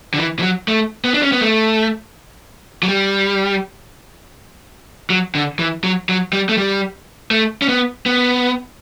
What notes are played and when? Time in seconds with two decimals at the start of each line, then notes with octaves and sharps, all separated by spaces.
0.14 D3
0.18 E3
0.39 E3
0.42 F#3
0.68 A3
1.04 B3
1.14 D4
1.23 C#4
1.32 B3
1.41 A3
2.83 F#3
2.88 G3
5.10 F#3
5.35 D3
5.59 E3
5.84 F#3
6.09 F#3
6.33 G3
6.49 A3
6.57 G3
7.31 A3
7.62 C#4
7.69 B3
8.06 B3